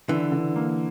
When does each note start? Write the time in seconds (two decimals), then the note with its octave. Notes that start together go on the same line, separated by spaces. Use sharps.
0.09 D3 E3
0.32 D3
0.56 A#3